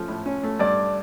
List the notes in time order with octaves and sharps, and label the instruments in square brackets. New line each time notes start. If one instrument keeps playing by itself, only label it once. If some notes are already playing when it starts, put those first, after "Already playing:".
Already playing: [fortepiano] F3 A3 C#4
A2
C#4
A3
[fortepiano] G2 [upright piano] D5